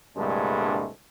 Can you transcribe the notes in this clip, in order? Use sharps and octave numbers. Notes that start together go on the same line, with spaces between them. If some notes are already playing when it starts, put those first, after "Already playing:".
C2 G2 A#2 D3 G#3 A3